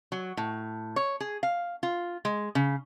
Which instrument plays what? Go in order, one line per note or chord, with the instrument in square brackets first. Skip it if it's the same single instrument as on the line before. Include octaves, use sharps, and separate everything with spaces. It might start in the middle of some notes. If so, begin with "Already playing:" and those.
[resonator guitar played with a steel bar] F#3
A2
C#5
G#4
F5
F4
G#3
C#3